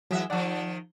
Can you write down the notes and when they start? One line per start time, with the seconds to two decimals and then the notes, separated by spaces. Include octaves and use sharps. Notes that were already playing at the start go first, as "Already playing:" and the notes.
0.11 E3 F#3 G#3 E5 F#5
0.30 D#3 F3 D5 F#5 A5